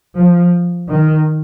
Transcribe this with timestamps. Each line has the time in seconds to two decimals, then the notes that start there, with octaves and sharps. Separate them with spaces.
0.15 F3
0.89 D#3